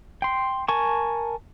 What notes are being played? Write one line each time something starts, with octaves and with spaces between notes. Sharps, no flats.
G5 C6
A#4 G#5 A5 C#6